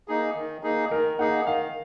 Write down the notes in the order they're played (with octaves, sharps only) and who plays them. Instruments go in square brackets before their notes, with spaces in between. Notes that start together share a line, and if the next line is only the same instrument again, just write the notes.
[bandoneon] A#3 D#4 G#4
D#3
A#3 D#4 G#4
[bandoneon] D#3 [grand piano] A#4
[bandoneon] A#3 D#4 G#4 [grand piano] F#5
[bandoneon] D#3 [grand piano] F5